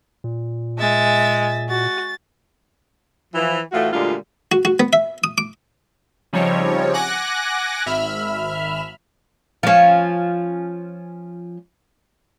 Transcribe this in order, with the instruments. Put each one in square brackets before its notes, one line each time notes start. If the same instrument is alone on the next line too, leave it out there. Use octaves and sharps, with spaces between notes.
[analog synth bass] A#2
[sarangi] G#3 [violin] E5 A6
[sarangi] F#4 [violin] A6
[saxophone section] E3 F3
A2 E3 A3 F4 F#4
D2 A#2 G3 G#3 F4
[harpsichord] F#4
F#4
B3
E5
D#6
D6
[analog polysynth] C#3 F3 G3 C4 D#4 C#5
F#5 G#5 D6 F#6 A#6
G#1 E5 B5 F6
[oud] F3 C#4